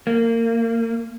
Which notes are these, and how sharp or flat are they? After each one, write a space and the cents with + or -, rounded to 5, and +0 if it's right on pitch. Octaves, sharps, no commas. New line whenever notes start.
A#3 -25